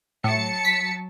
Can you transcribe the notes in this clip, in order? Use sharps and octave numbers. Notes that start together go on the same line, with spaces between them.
A2 F#3 A5 C#7
B6